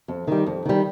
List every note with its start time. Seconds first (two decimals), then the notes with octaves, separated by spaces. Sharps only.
0.08 F2
0.28 D#3 G3
0.46 F2
0.66 D#3 G3